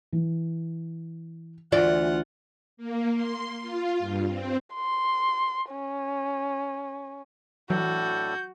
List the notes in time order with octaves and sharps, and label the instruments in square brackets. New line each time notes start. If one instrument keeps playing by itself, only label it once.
[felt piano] E3
[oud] D2 E3 D5 [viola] F4 F#5
[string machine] A#3
C6
F4
G2
C4
[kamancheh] C6
C#4
[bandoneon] A2 D4 A4 [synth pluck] E3 F#3 [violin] F#4 [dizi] G6